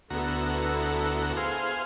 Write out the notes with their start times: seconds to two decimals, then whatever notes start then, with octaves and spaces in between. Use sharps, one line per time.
0.10 D2 B3 E4 F#4 A4 A#5
1.37 G#4 C5 F5